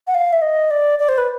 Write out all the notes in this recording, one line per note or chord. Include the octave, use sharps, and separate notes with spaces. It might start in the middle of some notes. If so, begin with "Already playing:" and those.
F#5
F5
E5
D#5
D5
D5
C5
B4